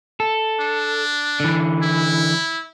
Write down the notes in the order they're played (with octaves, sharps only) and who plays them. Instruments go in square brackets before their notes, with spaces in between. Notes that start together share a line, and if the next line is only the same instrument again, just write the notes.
[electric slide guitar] A4
[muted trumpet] D4
[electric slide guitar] D3 E3
[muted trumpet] E4